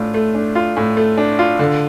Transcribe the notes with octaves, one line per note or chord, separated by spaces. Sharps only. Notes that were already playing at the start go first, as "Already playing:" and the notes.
Already playing: A2 D4 F4
A3
D4
F4
A2
A3
D4
F4
D3